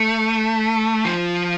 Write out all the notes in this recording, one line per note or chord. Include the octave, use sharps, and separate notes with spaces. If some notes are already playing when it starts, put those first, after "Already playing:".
Already playing: A3
F3